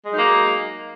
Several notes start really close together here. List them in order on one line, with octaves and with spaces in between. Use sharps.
G#3 F#3 D#4 A#3